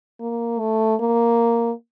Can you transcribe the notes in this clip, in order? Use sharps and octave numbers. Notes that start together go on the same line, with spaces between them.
A#3
A3
A#3